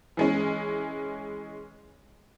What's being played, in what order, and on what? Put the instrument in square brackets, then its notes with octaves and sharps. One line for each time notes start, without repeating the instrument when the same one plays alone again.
[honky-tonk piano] E3 G#3 C#4